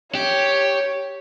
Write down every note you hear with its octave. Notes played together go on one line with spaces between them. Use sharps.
G4 C#5